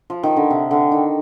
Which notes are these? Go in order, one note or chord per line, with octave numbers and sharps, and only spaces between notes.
F3
D#3
D3
C3
D3
D#3